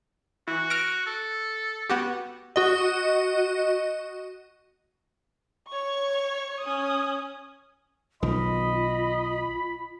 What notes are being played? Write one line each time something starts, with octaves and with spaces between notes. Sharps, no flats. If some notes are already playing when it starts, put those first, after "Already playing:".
E3 F#4
F6 A#6 D7
A4
B3 F#4 G4
F#4 D#5
C#5 C#6
C#4 D#6
B1 D#3 F4 D#5 B5